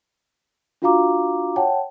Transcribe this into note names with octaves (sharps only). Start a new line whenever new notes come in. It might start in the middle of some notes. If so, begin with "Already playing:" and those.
D4 F4 F#4 F5 A#5 D6
C#5 F#5 G5 A5